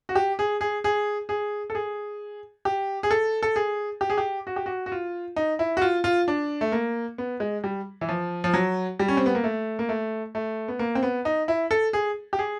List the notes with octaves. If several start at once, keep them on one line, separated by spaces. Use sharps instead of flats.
F#4
G4
G#4
G#4
G#4
G#4
A4
G#4
G4
G#4
A4
A4
G#4
G4
G#4
G4
F#4
G4
F#4
F#4
F4
D#4
E4
F#4
F4
F4
D4
A3
A#3
B3
G#3
G3
E3
F3
F3
F#3
G3
C#4
C4
B3
A#3
A3
A#3
A3
A3
B3
A#3
C4
B3
D#4
E4
A4
G#4
G4
G#4